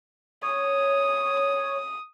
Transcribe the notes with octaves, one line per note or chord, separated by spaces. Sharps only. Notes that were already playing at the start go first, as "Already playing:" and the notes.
C#5 D#6